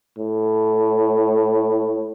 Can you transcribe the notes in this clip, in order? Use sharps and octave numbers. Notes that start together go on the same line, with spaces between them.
A2